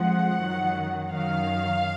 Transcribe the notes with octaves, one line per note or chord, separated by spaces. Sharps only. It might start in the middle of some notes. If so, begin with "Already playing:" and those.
Already playing: F2 F3 G#3 F#5
F#2 D#3 F#3
F#2 D#3 F#3 F5